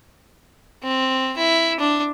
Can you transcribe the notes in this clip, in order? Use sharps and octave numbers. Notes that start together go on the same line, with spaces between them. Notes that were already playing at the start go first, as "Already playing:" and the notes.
C4
E4
D4